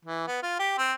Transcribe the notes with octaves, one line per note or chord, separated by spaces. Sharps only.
E3
B3
F4
G4
C4